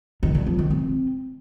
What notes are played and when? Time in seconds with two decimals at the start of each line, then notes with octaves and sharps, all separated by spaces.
0.23 D#3
0.35 D3
0.47 F3
0.58 D#3
0.70 C4